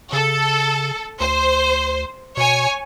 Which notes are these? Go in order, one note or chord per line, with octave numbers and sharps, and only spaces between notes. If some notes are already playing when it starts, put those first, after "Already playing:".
C#3 A4
D2 C5
B2 C#5 G#5